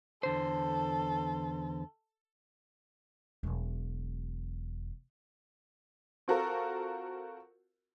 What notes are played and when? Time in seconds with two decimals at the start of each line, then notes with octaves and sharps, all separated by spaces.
0.23 E2 D3 A4 C5
3.43 E1 F#3
6.28 C4 F4 F#4 A4 A#4